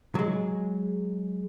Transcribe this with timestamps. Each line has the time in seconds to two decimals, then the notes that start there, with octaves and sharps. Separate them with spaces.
0.15 F#3 G#3